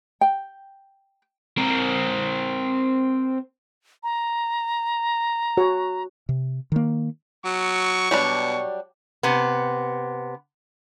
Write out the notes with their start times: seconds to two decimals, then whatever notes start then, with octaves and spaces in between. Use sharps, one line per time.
0.21 G5
1.57 C4 A#4
4.03 A#5
5.57 F#4 C#5
6.29 C3
6.72 D#3 A#3
7.45 F#3 C#6
8.11 B2 F#3 G3 D4
9.23 C3 B3